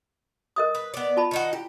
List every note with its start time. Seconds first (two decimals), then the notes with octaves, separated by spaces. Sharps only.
0.56 A#4 D#5 D#6
0.75 B4
0.94 B3 D5
1.17 F4 A5 B5
1.31 D#3 D#4 F#4
1.53 E4 G4